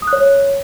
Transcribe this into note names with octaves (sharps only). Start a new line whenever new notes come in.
D#6
F#6
C#5